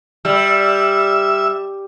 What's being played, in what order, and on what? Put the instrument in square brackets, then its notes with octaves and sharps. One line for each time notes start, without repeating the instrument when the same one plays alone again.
[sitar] G3 [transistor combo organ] E5